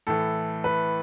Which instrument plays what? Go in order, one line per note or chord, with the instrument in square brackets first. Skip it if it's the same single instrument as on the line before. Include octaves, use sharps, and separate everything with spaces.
[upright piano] A2 E3 A4
B4